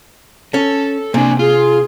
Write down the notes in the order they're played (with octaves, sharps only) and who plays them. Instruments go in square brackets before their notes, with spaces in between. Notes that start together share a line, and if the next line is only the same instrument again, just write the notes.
[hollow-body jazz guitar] C#4 [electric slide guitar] A4
[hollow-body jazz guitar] C3 [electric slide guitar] A#3 D4 [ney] G#5
[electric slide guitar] F4 [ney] G#4